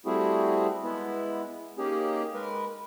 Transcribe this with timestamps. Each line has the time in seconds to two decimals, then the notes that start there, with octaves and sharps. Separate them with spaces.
0.06 G3 A3 C4 E4 F#4 G#4
0.84 G#3 B3 E4
1.78 A#3 C#4 D#4 G4 G#4
2.34 G#3 A#4 B4